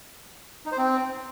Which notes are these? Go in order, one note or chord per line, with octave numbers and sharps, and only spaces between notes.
D#4
C5
C4